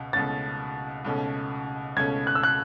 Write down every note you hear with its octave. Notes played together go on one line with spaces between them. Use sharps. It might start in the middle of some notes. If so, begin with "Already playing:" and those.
Already playing: C#2 B2 C#4
C#2 B2 A3 C#4 A6
C#2 B2 A3 C#4
C#2 B2 A3 C#4 G#6
F#6
E6
F#6